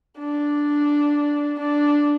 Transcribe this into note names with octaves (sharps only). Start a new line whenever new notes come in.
D4
D4